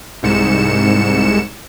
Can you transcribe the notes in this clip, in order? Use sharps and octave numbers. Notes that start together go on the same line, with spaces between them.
C2 G#2 C#7 E7